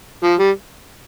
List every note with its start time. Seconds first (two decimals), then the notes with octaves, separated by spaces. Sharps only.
0.24 F3
0.39 G3